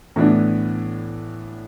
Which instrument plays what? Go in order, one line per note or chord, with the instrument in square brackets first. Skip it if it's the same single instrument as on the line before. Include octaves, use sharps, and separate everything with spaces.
[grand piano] A2 E3 B3 D4